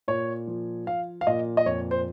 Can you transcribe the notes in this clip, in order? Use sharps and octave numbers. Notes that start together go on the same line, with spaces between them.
A#2 C#5
F3
F3 F5
F5
A#2 D#5
D#5
F2 C#5
C5